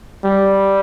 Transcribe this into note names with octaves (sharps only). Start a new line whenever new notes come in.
G3